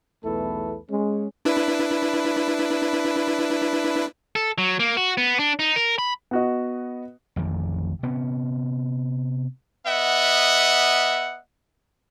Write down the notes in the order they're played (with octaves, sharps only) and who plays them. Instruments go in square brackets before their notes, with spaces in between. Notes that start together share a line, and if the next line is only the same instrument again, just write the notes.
[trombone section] B1 E2 A3 E4 A4 B4
G#3 C#4
[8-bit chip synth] D4 E4 B4
[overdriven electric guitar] A4
F#3
A#3
F#4
B3
D4
D#4
A#4
B5
[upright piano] B3 F#4 D#5
[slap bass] A1 F2 D#3
C3 B3 C#4
[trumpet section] B3 D#5 E5 F#5